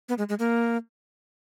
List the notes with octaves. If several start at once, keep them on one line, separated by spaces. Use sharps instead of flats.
B3
G#3
G#3
A#3